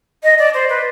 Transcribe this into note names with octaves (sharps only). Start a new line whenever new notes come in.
D#5
D5
C5
B4